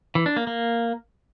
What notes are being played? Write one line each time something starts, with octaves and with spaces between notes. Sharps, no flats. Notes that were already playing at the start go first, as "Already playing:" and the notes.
E3
D4
A#3
A#3